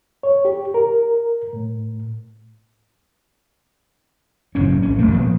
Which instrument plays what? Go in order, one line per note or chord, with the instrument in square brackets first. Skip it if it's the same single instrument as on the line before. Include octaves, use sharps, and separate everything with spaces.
[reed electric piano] C#5
G4
A#4
A2
[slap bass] F#1 A2 C3 C#4
A#1 C#4
G#1 F2 A3 A#3
A#2 F3 B3 C4